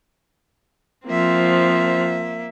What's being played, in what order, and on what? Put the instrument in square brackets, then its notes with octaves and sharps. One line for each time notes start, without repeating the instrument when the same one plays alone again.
[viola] F3 C4 [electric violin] A#3 E5